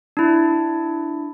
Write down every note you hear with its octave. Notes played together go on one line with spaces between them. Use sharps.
D4 E4